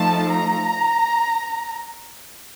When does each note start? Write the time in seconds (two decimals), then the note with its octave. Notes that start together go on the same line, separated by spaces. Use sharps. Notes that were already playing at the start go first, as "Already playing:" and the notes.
Already playing: F3 A3 D#4 A5
0.32 A#5